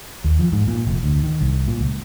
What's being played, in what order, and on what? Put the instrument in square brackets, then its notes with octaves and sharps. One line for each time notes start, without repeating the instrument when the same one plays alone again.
[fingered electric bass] D#2
F3
G#2
A#2
F1
D2
D#3
C2
A#2
C#2